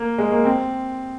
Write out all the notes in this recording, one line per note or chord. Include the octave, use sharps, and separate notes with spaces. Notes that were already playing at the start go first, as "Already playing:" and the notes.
Already playing: A#3
G#3
A#3
C4